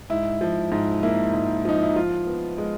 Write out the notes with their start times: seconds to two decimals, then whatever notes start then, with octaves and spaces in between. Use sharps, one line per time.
0.10 G#2 E4
0.41 F3
0.72 G#2
1.03 A#3 E4
1.34 G#2
1.65 F3 D#4
1.82 E4
1.96 F3 F4
2.27 B3
2.58 G#3